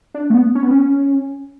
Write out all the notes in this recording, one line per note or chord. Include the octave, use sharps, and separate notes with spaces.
D4
A3
B3
C#4
B3
C#4